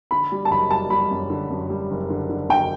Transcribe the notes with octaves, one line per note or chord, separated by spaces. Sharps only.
D3 B5
G3
A5
F#1 B5
G3 A5
G3 B5
F#2
D3
F#2
G3
F#1
D3
D3
D3 G5